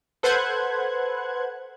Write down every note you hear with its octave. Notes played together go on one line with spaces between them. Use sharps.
A4 B4 C5 F#5 F#6 G#6